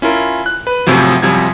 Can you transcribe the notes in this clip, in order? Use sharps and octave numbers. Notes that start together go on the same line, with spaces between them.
C#4 E4 F4 A#4
F#6
B4
F#2 A2 C3 F3 F#3
F#2 C3 F3 G3 G#6